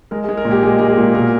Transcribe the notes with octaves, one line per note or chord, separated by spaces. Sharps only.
G#3 A#4
G#4
G#3
A#4
A#2
G4
G#3 G#4
G#3 A#4
G#4
A#2
B2 A#4